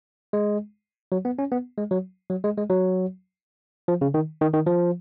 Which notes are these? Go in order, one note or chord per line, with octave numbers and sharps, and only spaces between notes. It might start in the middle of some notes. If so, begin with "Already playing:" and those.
G#3
F#3
B3
C#4
B3
G#3
F#3
F#3
G#3
G#3
F#3
F3
C#3
D#3
D#3
D#3
F3